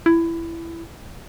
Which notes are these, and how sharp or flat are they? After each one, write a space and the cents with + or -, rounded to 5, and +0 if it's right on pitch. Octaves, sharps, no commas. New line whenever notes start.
E4 +15